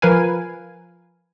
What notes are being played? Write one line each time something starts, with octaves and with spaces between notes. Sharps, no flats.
F3 A#4 B4 F5 G#5